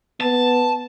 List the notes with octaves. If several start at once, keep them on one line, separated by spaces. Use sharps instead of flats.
B3 A5